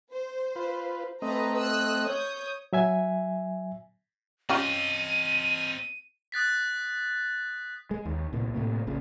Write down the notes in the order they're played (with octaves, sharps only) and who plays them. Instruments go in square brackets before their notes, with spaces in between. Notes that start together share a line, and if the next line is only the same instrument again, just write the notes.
[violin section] C5
[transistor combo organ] F4 B4
[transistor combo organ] A3 C4 D#5 [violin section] B4 A#5
[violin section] E6 F#6
C#5 D#6 G6
[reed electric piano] F#3 E5 G#5
[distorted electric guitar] C4 D#5 [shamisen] C#4 F4 G4 [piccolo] D#7
[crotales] D#6 F#6 A6 B6
[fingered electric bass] G#3
D#2
C2 A#2
A2 C3 A#3
A#1 A#2 C#3